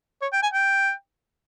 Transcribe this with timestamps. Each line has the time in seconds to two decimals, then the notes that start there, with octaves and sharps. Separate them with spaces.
0.22 C#5
0.33 G5
0.43 G#5
0.54 G5